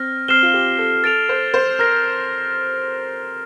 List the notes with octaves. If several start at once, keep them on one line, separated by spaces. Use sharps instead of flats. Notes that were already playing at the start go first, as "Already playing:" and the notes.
Already playing: C4 F6 A#6
C4 F6 C7 E7 G7
F4
G4
A4
A4 A6 D7 F7
C5
C5
A#4 F6 A#6 D7